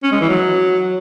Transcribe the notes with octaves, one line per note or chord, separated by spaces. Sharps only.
C#4
G#3
E3
F#3